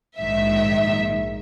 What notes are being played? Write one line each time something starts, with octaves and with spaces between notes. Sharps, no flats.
A#1 G#2 D#3 E5